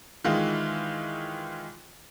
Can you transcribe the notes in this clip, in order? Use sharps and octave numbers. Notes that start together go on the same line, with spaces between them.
D#3 E3 G#3 F4